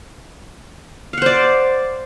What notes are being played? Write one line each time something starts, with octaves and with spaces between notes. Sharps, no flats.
C5 D5 F5 F#5